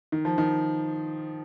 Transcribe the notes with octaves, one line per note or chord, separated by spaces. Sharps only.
D#3
F3
D#3